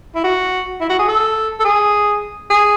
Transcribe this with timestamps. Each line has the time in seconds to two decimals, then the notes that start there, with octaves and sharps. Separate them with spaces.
0.15 E4
0.24 F#4
0.81 E4
0.89 F#4
0.99 G#4
1.08 A4
1.60 A4
1.65 G#4
2.50 G#4